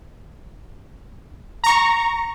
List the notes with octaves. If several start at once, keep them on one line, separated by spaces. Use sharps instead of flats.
A#5 C#6